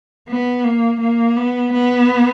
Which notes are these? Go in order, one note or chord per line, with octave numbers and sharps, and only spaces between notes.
B3
A#3
A#3
B3
B3